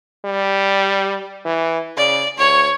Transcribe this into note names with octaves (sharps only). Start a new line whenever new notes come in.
G3
E3
C#3 D5
D2 C#5